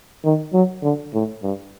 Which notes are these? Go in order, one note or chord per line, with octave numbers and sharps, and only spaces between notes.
D#3
F#3
D3
A2
G2